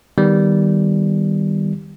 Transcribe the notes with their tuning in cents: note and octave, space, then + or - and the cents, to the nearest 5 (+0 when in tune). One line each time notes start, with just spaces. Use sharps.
D#3 +0 G3 +0 B3 +0